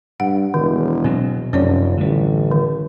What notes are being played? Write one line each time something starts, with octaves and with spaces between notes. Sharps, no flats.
G2 F#5
E1 D#3
B2 F#3 C4
F1 F#2 C#4 C#5 D5
A1 D3 G3
D#3